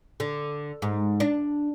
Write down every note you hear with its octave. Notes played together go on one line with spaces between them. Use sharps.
D3
G#2
D4